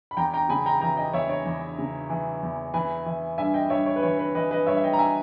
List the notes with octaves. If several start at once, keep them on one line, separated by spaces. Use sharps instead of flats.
B5
E2 G5 A#5
G5 A#5
C#3 G#5 B5
G5 A#5
E3 G5 A#5
D#5 G5
E2 C#5 E5
C#5
E2
C#3
E3
E2
E3 G#5 B5
E3
G2 E5 G#5
D#5 G5
G2 C#5 E5
C#5
B4
E3 C#5
B4
E3 B4 D#5
B4 D#5
G2 C#5 E5
E5
D#5 G5
A#5
E5 G#5